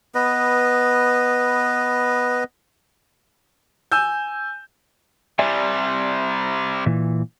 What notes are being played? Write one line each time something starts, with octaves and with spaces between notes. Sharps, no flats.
B3 B4 D#5
G#5 E6 G6
C3 G3 D5 E5 G#5
A#2 E3